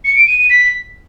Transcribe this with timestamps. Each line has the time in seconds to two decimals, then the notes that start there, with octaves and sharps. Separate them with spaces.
0.05 C#7
0.16 D7
0.27 D#7
0.39 D#7
0.50 B6